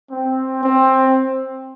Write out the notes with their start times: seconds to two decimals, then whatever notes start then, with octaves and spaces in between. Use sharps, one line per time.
0.10 C4
0.63 C4